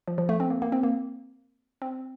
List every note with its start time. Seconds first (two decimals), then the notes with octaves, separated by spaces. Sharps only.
0.08 F3
0.18 F3
0.29 A3
0.40 C4
0.50 A#3
0.62 A#3
0.72 C4
0.83 A#3
1.82 C4